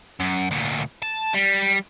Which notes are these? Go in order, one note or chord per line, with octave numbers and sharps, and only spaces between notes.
F#2
D2 A#2
A5
G3